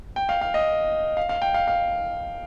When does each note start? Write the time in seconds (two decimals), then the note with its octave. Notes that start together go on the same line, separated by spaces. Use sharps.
0.16 G5
0.29 F5
0.41 F5
0.54 D#5
1.17 F5
1.29 F5
1.42 G5
1.54 F5
1.68 F5